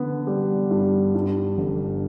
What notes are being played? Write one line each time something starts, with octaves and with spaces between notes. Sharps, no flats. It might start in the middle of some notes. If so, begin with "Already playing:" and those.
Already playing: D3 B3
G3
G2
G2
G1